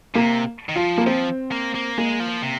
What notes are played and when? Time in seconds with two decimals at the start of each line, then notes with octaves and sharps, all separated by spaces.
0.15 C3 A#3
0.69 D#3
0.76 F3 F4
0.98 A#3
1.06 F3 C4
1.52 A#3
1.75 A#3
1.98 G#3 A#3
2.20 F3
2.43 C3